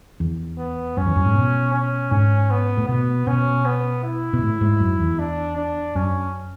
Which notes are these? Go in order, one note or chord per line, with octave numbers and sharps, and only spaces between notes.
E2
B3
F#2 C#4
E2
F#2
G#2
B2
C#4
G#2 C#4
B3
A2
B2 B3
B2 C#4
B3
E4
B2
A2
G#2
F#2
E2
D4
D4
F#2 C#4